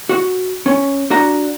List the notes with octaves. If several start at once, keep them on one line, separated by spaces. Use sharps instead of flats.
F#4
C#4
D4 F#4 A#5